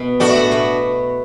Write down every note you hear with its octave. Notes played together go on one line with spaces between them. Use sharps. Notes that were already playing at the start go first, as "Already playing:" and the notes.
Already playing: B2 B3
A2 A3 D4 F#4
A2 A3
B2 B3